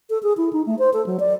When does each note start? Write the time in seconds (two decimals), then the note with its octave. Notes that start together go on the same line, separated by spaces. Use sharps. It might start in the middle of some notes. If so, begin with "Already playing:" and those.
0.10 A4
0.23 G#4
0.37 E4
0.53 D#4
0.66 A3
0.79 C5
0.93 A4
1.06 F#3
1.20 D5